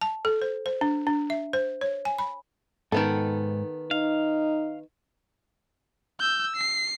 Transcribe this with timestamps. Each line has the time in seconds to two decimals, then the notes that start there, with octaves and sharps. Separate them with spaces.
0.02 A5
0.25 A4
0.42 C5
0.66 C5
0.81 D4
1.07 D4
1.30 E5
1.53 C5
1.81 C#5
2.05 G#5
2.18 B5
2.92 G#2 D#3 B3 A4
3.91 D#4 F5
6.20 E6 G6
6.57 C7